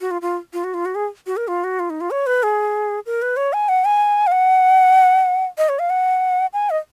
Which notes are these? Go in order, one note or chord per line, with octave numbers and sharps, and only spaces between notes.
F#4
F4
F4
F4
F#4
F4
F#4
G#4
F#4
A#4
F4
F#4
F4
D#4
F4
C#5
B4
G#4
A#4
B4
C#5
G#5
F#5
G#5
F5
F#5
D#5
C#5
F5
F#5
G#5
D#5